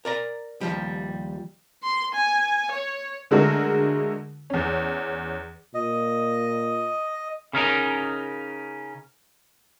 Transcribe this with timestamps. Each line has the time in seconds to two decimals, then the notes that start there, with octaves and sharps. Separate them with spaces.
0.05 A#4 D5 A#5
0.61 D#2 F3 G3
1.83 C6
2.14 G#5
2.71 C#5
3.31 D3 G#3 A3 F#4 A#4
4.50 E2 C#4
5.75 A#2 D#5
7.53 C#3 C#4 D#4 A#4